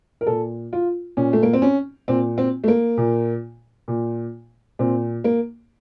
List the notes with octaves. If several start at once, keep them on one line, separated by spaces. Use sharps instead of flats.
A#4
A#2 A4
F4
A#2 C#4
A3
A#3
C4
C#4
A#2 C4
C4
A3
A#3
A#2
A#2
A#2 C4
A#3